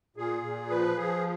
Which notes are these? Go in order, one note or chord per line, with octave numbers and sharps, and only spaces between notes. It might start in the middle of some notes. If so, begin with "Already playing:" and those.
A#2 G#4
A#2
F3 B4
F3 G#4